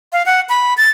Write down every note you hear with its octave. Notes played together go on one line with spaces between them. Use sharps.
F5
F#5
B5
A6